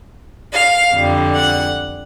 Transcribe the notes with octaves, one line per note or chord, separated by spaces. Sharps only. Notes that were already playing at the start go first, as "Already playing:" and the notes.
F5
F2 D3 G3
F#5